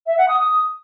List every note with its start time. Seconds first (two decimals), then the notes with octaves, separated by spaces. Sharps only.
0.07 E5
0.17 F#5
0.28 D#6
0.39 D#6